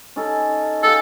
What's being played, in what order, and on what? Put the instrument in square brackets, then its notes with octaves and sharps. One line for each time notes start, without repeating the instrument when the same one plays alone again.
[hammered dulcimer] C#4 D#4 A4
[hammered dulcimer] G#4 F5 G5 [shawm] A4